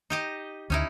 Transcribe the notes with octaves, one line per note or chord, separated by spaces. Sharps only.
D#4 G4 D#5
D2 C#4 D#4 E4